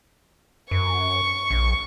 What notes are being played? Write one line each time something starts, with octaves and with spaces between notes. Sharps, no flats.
F#2 C#6
A#1